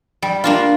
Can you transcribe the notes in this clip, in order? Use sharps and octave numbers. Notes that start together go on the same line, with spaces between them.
G3
A#3 D4 F4